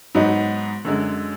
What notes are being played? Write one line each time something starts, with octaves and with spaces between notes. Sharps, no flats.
G#2 F#3 B3 D#4
F#2 D3 G#3